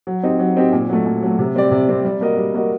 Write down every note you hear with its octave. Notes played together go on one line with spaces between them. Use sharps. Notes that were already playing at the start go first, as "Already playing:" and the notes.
F#3
C4 D#4 G4
F#3
C4 D#4 G4
A#2
F#3 A3
A#2
F#3 A3
C3
G3 C4 G4 D5
C3
G3 C4 G4 D5
G3
A#3 F#4 A#4 D#5
G3
A#3 F#4 A#4 D#5